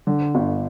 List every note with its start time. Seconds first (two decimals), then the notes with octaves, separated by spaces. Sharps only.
0.07 D3
0.35 G1